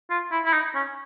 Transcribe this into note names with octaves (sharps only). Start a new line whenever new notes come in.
F4
E4
E4
D#4
C#4